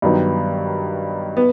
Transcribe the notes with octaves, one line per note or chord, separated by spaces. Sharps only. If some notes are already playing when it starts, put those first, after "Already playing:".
G2 D#3 F#3 B3 D#4
B3